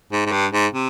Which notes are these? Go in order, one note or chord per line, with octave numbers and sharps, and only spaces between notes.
G#2
G#2
G2
G#2
C3